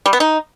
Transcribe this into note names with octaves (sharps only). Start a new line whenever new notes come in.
G3
B3
D#4